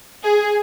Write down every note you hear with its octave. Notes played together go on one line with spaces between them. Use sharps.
G#4